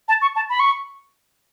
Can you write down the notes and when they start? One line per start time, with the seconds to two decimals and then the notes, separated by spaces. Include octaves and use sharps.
0.08 A5
0.22 C#6
0.36 A5
0.50 B5
0.60 C#6